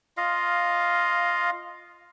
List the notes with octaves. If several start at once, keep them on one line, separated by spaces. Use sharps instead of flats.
F4 D#5 F5